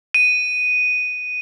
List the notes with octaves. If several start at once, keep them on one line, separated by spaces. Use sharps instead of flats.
D#7